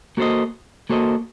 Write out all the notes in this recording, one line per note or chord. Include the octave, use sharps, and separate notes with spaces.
A#3 F#4 A4 C5 D#5
A#3 F#4 A4 C5 D#5